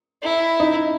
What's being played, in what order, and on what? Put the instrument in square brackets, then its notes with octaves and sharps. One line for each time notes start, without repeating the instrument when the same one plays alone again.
[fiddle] E4
[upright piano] D#4